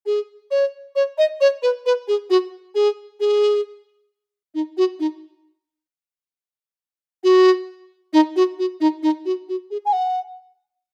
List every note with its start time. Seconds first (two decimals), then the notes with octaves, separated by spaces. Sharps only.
0.06 G#4
0.51 C#5
0.96 C#5
1.18 D#5
1.41 C#5
1.63 B4
1.86 B4
2.08 G#4
2.30 F#4
2.75 G#4
3.20 G#4
4.55 D#4
4.77 F#4
5.00 D#4
7.24 F#4
8.13 D#4
8.36 F#4
8.59 F#4
8.81 D#4
9.03 D#4
9.25 F#4
9.49 F#4
9.71 G#4
9.85 G#5
9.93 F#5